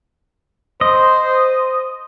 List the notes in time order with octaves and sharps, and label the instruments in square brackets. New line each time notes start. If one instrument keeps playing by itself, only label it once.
[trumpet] C5 [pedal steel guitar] D#5